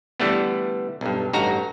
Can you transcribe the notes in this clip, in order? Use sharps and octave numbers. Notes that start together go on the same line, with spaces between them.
D3 E3 G3 A3 B3
B1 G2
A1 G2 D#4 F#4 A#5